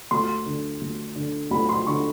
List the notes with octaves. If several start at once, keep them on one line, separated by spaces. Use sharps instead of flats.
D2 C6
D3
D2
D3
D2 B5
C6
D3 C#6